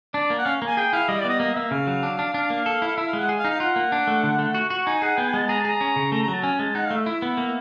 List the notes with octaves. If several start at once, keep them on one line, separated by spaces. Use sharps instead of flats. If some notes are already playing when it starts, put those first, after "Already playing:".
D4 D5
A#3
F#5
C#4 F5
A#3 G#5
G#4 G5
E4 F5
G3 D#5
D5
B3 D#5
A#3 D#5
A#3 E5
C#3 F5
F#3
D4
D4
D4
A#3
A4
E4
F5
E4 E5
F5
G#3
F#5
G#4
F5
D#4
F5
F4 F#5
A#3
D4
A3
D3
A3
F#4
F#4
D#4 G#5
G#4 F#5
B3 G5
G#5
G#3 A5
G#4 A#5
A5
G#4 A#5
C#4
C#3
A3 A#5
A#5
F#3
A5
C#4 G#5
G#3 A5
D#4 F#5
F5
A3
E5
E4
B3
A#3